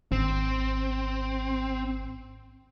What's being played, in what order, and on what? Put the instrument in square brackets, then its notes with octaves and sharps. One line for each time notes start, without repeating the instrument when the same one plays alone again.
[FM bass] G#1 [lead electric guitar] C4